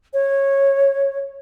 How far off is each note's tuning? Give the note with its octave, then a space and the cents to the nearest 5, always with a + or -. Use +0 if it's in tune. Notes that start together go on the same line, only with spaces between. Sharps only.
C#5 -15